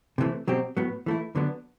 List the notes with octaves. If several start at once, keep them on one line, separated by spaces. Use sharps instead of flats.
C3 E3 A3
B2 F#3 C4 G4
A2 F#3 B3
E3 A3 E4
D3 F#3 B3 D4